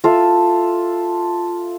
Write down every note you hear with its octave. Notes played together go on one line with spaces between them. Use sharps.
F4 A4 E5